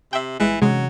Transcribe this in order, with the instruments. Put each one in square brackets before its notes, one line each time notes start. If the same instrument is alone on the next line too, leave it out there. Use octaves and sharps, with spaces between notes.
[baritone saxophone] C3 [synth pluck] E5 G5
[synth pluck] G1 G#3 [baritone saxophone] E3
[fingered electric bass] C3 E3 C#4 [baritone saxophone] F#3 [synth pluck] G#3